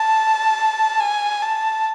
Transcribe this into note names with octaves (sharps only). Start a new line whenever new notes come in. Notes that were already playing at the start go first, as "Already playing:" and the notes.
Already playing: A5
G#5
A5